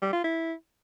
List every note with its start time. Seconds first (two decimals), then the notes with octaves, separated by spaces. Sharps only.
0.02 G3
0.13 F4
0.24 E4